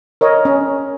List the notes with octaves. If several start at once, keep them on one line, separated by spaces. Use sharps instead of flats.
A#4 C#5 D#5
C#4